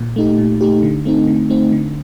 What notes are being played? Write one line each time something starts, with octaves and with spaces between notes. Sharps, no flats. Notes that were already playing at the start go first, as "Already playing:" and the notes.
Already playing: A#2
A3 D#4 G4
A#2
A3 D#4 G4
D3
A3 C4 D#4
D3
A3 C4 D#4
D3